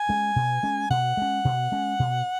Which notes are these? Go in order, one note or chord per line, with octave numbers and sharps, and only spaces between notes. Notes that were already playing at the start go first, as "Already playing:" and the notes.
Already playing: G#5
G#3 C#4
B2
G#3 C#4
B2 F#5
G#3 C#4
B2
G#3 C#4
B2